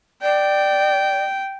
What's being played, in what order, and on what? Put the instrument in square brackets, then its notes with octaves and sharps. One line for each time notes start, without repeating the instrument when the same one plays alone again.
[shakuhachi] D5 [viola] G5